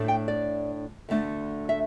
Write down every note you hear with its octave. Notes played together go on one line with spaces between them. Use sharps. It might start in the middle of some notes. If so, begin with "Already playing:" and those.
Already playing: A2 A3 D4
G5
D5
D2 D3 A3 D4
E5